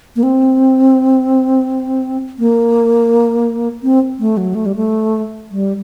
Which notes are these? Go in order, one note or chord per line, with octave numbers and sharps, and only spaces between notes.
A#3
C4
A#3
C4
A3
F#3
A3
G3
A3
G3